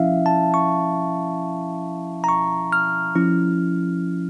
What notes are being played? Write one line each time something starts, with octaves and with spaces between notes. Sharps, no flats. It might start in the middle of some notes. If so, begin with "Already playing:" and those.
Already playing: F3 C#4 E4 E5 F5
A5
C#6
A#5
C#6
F6
F3 C#4 E4